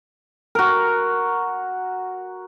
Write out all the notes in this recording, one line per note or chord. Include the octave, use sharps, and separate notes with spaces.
F#4 A#4